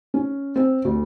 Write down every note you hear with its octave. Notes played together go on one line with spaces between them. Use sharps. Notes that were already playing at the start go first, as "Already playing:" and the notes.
C#4
C4
D2